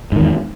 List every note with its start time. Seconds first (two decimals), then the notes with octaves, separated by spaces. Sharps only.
0.12 G#2
0.16 D#3
0.20 E2